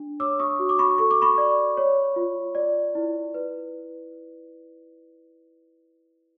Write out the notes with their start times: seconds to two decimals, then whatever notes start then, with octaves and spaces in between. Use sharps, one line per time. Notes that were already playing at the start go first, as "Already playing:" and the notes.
Already playing: D4
0.20 C#5 D6 E6
0.39 C#6 D#6
0.59 F#4
0.69 D6
0.79 B5 C#6
0.98 A4 C#6
1.11 D6
1.22 B5 C#6
1.38 D5
1.77 C#5
2.16 F4
2.55 D5
2.95 E4
3.34 B4